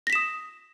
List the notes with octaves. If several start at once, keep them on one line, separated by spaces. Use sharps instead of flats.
D#6 A#6 B6 E7